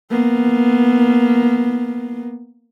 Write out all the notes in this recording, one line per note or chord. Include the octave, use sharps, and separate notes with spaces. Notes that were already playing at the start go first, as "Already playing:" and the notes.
A#3 B3